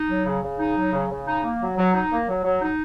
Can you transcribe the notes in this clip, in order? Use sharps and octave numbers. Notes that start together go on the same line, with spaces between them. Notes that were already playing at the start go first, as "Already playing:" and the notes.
Already playing: D#4
F#3
C#3
C#3
D#4
F#3
C#3
C#3
D#4
A#3
F#3
F#3
D#4
A#3
F#3
F#3
D#4